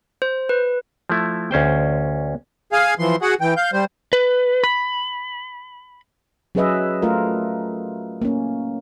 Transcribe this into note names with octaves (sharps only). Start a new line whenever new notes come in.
C5
B4
F3 A3 E4
D2 C#4 C5 G5
G#4 F5 G#5
E3 F3 C6
F#4 G#4 F#5
E3 G5
F5 G6
G3 C5
B4
B5
F#3 C#4 G#4 B4 D#5 E5
A3 F4 A#4
A#3 C#4